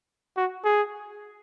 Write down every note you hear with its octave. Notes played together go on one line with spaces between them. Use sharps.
F#4
G#4